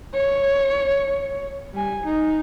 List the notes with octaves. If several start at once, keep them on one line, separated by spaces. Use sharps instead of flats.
C#5
G3 G#5
D#4